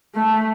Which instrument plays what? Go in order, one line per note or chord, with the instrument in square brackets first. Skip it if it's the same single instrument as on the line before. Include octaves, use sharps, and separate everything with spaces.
[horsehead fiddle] A3